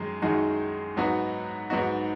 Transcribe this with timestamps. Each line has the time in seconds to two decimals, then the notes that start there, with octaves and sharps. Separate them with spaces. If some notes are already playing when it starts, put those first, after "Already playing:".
Already playing: F#2 D#3 G#3
0.22 F#2 D#3 G#3 D#4 F#4
0.97 G#2 F#3 B3 D#4 F#4
1.70 G#2 F#3 B3 D#4 F#4